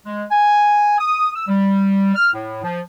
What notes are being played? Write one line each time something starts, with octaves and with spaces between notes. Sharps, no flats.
G#3
G#5
D#6
E6
G3
F6
A2
F3